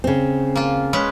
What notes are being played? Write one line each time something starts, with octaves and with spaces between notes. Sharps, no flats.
C#3 C4
A#3 F4
G#3 C#4 B4